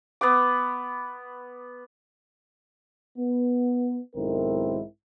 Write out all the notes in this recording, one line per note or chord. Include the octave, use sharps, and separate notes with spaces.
B3 B4 D6
B3
B1 G#2 D#3 C4 E4 A#4